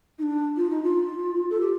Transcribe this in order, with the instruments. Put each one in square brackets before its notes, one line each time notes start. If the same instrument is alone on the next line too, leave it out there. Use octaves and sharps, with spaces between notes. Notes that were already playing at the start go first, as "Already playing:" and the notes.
[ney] D#4
D4
F4
D#4
F4
A4
G4